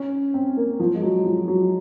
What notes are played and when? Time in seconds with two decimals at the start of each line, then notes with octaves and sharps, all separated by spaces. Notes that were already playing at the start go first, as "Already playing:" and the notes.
Already playing: C#4
0.34 C4
0.57 A#3
0.80 F3
0.95 G#3
1.02 F#3
1.26 F3
1.48 F#3